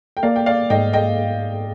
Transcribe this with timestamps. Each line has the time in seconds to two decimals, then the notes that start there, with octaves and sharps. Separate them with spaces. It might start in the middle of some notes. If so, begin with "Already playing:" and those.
0.17 G5
0.23 A#3 D5 F5
0.36 G5
0.46 D5 F5
0.70 G#2 D#5 G5
0.93 D#5 G5